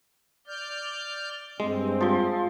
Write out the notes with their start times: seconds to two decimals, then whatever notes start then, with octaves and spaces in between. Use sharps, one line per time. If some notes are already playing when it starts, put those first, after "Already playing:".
0.47 D5 F6 G6
1.60 G2 G#3 C4
2.01 F3 C6